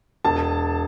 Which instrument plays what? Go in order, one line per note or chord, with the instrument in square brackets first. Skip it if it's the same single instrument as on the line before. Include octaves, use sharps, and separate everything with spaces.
[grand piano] E1 A5